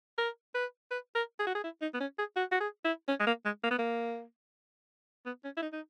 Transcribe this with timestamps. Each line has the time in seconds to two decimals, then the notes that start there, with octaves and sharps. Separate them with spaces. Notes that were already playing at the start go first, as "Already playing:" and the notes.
0.18 A#4
0.55 B4
0.91 B4
1.15 A#4
1.40 G#4
1.47 F#4
1.55 G#4
1.64 E4
1.82 D#4
1.94 B3
2.01 C#4
2.18 G#4
2.36 F#4
2.52 F#4
2.60 G#4
2.85 E4
3.09 C#4
3.20 G#3
3.27 A#3
3.45 G#3
3.63 A#3
3.71 B3
3.79 A#3
5.26 B3
5.44 C#4
5.57 E4
5.62 D#4
5.73 D#4